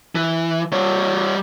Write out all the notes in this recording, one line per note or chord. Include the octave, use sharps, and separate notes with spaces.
E3
G3 C#5